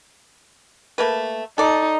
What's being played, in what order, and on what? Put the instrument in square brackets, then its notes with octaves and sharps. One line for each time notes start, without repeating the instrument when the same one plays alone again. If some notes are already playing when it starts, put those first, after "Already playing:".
[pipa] A3 A#3 B4
[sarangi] D#4 [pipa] A4 D5